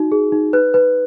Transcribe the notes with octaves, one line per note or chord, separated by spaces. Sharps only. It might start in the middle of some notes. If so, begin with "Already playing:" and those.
Already playing: D#4 F#4
G#4
D#4
B4 F#6
B4